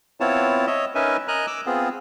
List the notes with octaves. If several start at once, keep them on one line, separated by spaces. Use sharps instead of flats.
B3 C4 E4 F4 C#5 A5
C#5 D#5 E5
C#4 D#4 A#4 B4 E5 G#5
A#4 D#5 G#5 A#5 F#6
D6 E6
B3 C4 F4 G#4